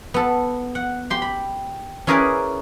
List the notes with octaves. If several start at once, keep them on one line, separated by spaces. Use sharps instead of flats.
B3 A4
F#5
G4 C6
B5
C#4 E4 G#4 A#4 B4 D5